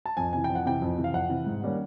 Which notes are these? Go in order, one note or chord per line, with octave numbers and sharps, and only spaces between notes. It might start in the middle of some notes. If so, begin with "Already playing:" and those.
A5
F2 G#5
C3 E3 G#5
G5
F2
F#5
C3 E3 G5
F2
C3 E3
F5
F2 F#5
C3 E3
G#2
D#3 G3 A#3 C#4